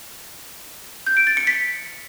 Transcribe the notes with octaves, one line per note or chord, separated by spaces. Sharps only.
G6
D7
A6
C#7
B6